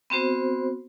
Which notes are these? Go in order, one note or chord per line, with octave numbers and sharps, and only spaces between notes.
B3 C4 F#4 C5